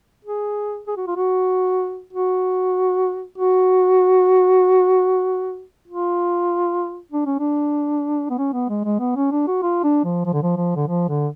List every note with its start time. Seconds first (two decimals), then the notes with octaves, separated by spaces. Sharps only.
0.25 G#4
0.87 G#4
0.97 F#4
1.07 F4
1.16 F#4
2.13 F#4
3.38 F#4
5.88 F4
7.12 D4
7.26 C#4
7.39 D4
8.30 B3
8.38 C#4
8.53 B3
8.69 G#3
8.85 G#3
9.00 B3
9.16 C#4
9.32 D4
9.47 F#4
9.62 F4
9.84 D4
10.05 F3
10.26 F3
10.33 D3
10.43 F3
10.57 F3
10.76 D3
10.87 F3
11.09 D3